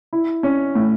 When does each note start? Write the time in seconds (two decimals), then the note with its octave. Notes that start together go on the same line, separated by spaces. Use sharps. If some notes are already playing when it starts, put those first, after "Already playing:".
0.13 E4
0.43 C#4
0.75 A2